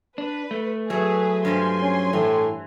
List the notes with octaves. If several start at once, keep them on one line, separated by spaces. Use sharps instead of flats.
D4 B4
A3
F#3 A3 G#4 B4
G2 F3 G4 G#5 C6
C#4
A2 E3